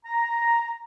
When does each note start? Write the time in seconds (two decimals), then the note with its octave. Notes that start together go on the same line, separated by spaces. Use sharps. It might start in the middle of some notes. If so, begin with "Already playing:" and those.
0.06 A#5